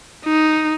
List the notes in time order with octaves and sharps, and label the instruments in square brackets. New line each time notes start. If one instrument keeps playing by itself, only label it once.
[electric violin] D#4